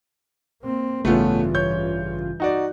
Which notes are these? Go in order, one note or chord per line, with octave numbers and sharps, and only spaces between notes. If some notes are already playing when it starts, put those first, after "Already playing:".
A#3 C4
A1 G2 C#3 E3 A3 B3 C#4 F4
C#5 G6
D#4 F#4 D5